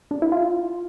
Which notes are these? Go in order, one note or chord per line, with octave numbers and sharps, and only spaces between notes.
D4
E4
F4